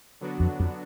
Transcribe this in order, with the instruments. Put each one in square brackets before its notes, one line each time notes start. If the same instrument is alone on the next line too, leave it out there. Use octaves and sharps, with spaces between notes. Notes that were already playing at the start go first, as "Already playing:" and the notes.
[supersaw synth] D3 F#3 B3 D4 F#4
[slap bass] F2
F2